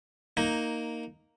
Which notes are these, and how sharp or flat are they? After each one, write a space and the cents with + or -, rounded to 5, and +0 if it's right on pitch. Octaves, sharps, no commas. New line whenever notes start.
A#3 -5 D#4 +5